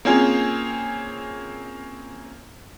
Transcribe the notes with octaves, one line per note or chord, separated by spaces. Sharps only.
A#3 C4 C#4 F4 G#4